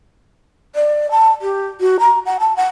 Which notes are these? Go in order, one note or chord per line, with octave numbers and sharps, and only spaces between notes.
D5
A5
G4
F#4
A#5
F#5
A5
F#5